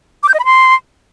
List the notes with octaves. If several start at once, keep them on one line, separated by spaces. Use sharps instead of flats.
D6
G6
D#5
B5
C6